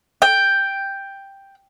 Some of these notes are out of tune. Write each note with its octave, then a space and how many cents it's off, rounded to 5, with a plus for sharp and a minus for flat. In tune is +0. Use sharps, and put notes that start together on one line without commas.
G5 +5